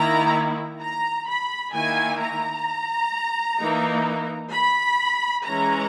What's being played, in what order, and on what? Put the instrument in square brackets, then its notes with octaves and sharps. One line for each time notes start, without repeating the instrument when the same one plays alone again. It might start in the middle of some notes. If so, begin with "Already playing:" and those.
Already playing: [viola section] D#3 A#3 E4 A#5
A#5
B5
D#3 A#3 E4 G#5
A#5
E3 A#3 D#4
B5
E3 G#3 C#4 A#5